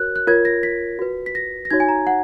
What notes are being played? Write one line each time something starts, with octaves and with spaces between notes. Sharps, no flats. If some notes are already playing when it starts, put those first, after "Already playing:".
Already playing: F#4 A#4 C#5 F#6
F#6
F4 A#4 C#5 G#6
A#6
B6
F#4 B4
B6
A#6
A#6
D#4 F#4 C#5 G#6
G#5
A#5
F#5